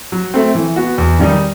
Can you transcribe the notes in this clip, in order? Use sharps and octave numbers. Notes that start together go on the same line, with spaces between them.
F#3
A3 C4
E3
B3 F#4
E2
D#3 G3 D#4